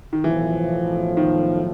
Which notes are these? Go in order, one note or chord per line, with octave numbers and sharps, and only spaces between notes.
D#3
B1 A2 E3 F3
D#3